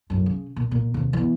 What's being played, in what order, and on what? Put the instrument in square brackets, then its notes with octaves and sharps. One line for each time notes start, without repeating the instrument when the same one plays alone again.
[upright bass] F#2 A2
C#3
A#2
A#2
D#2 C3
E3 B3